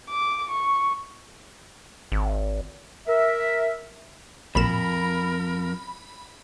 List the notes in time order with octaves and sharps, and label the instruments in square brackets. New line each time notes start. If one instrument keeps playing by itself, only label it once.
[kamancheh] D6
C#6
[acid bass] G#1
[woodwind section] A#4 E5
[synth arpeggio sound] A1 A#2 E7 [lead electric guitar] F2 [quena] A#4 [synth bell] B5